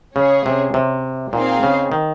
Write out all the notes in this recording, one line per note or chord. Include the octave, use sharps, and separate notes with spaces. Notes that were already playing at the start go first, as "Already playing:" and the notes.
C#3 C#4 G#4 C#5
C3
C3
A#2 C4 D#4 G#4 C5 F5
C#3
D#3